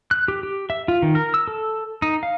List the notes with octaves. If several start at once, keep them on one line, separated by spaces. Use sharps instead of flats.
F#6
G4
G4
E5
F4
D#3
A#4
E6
A4
D#4
F5